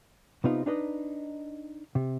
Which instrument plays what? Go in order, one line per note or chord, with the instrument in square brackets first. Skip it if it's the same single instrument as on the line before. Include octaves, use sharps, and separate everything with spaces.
[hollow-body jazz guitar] C3 B3 D#4 F4
D4 D#4 B4 D#5
C3